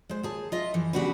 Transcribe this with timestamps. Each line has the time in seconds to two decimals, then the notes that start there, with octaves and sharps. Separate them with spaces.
0.09 G#3 C5
0.23 D#2 G#4 A5
0.52 F4 D#5 E5
0.74 F#2 E3 F3
0.93 C#3 B3 D4 F#4 G4 B4